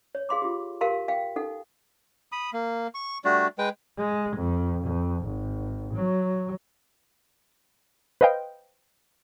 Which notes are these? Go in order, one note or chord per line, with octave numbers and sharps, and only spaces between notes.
C#5
G#4 F5 C6 D6
F4 G4
G4 A#4 F5 A5 C6
F5 G5
D#4 A4 F#5
B5 D#6
A#3
C#6
G3 A3 D4 F#4
G#3 B4 G5
G#3
F2
F2
G#1
F#3
B4 C5 D#5 F5 G5